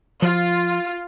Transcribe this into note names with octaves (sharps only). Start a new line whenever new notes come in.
F3 F4